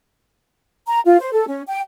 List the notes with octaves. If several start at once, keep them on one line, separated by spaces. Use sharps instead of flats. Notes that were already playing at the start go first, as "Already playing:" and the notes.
A#5
F4
C5
A4
C#4
G5